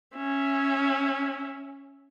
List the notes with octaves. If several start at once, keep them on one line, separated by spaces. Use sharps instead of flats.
C#4 E5